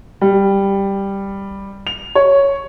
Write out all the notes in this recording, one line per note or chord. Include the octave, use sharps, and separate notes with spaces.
G3
F7
C#5